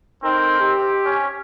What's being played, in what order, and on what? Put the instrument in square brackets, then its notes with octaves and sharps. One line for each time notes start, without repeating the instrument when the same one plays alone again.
[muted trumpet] C4 [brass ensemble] D#4 A4 A#4
[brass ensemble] G4
[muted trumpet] C#4